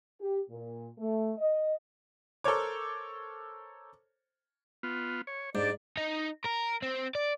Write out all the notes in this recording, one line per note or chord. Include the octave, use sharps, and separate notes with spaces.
G4
A#2
A3
D#5
A4 A#4 C5 C#5 D6
B3 F4
C#5
G#2 D4 G4 D5
D#4
A#4
C4
D5